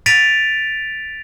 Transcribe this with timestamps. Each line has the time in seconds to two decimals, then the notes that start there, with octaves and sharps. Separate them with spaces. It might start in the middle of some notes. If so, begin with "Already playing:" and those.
0.06 A6 B6 D7 D#7 F7